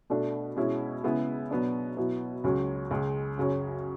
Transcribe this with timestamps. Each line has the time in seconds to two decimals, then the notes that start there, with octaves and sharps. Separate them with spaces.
0.10 B2 A3 D4
0.56 B2 G#3 C#4 E4
1.04 C#3 G#3 B3 E4
1.51 B2 F#3 B3 D4
1.97 B2 F#3 B3 E4
2.44 C#2 C#3 F#3 C#4
2.91 C#2 C#3 G#3
3.37 F#2 C#3 F#3 C#4